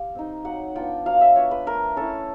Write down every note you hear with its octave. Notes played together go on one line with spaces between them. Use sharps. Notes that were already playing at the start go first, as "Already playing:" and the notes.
Already playing: G3 F5
C4 D#4
F#3 F#5
B3 D4 F4 G5
F#3 F5
E5
B3 D4 F4 C#5
B4
A3 A#4
C#4 E4 A4